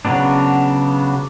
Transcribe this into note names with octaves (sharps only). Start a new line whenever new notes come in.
C#3 F#3 B3 D4